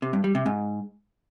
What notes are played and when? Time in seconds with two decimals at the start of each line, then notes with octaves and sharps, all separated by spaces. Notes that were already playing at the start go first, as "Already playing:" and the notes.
0.02 C3
0.13 G2
0.24 G3
0.35 C3
0.46 G#2